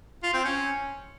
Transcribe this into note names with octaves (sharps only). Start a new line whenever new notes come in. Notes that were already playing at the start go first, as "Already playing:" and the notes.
F4
C4
C#4